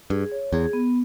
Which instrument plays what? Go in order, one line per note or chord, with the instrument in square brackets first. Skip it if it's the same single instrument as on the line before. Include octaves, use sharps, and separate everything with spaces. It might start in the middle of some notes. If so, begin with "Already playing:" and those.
[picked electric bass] G2 [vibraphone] G#4
[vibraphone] C#5
[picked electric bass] E2 [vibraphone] G#4
[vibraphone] B3